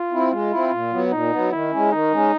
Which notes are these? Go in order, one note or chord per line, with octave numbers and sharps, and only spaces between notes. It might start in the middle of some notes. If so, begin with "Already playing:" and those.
Already playing: F4
C4 E4
G#3 F4
C4 E4
A#2
F#3 B3
A#2 D#4
F#3 B3
D#3 E4
G#3 C#4
D#3 D#4
G#3 C#4